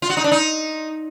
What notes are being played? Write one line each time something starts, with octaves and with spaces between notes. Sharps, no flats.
F4
F#4
D#4
D4
D#4